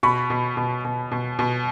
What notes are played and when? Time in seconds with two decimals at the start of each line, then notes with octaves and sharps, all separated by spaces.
0.03 B2 B5 C#6
0.30 B2
0.57 B2
0.85 B2
1.12 B2
1.39 B2